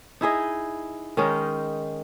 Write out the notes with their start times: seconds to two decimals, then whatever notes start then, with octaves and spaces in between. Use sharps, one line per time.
0.21 D#4 E4 G#4 D#5
1.17 D#3 G#3 C#4 D#4